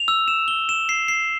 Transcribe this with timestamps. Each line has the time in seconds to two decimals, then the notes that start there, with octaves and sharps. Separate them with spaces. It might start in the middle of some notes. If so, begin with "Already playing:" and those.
Already playing: F7
0.08 E6
0.28 E7
0.48 G7
0.69 E7
0.89 C7
1.08 C7